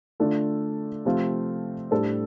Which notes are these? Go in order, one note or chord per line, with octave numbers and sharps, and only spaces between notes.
D3 A3 D4 F4 A4
C3 F3 A3 C4 F4
A2 G3 D4 A4 C5